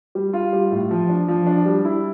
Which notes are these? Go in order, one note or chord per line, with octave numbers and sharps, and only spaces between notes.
G3
F4
G3
A2
F3
D4
F3
D4
G3
E4